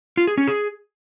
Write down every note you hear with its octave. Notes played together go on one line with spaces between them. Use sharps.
F4
G#4
C#4
G#4